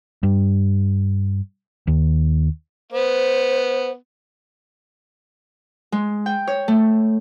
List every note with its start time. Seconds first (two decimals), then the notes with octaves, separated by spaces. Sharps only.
0.23 G2
1.87 D#2
2.92 B3 C5
5.92 G#3
6.26 G5
6.47 C#5
6.68 A3